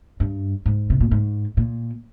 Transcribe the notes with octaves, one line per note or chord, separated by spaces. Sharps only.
G2
G#2
C3
A#2
G#2
A#2